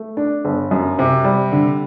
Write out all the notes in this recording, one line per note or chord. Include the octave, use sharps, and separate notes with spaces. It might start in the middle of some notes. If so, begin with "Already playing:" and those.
Already playing: A3
D4
G1
F#2
C3
G3
D3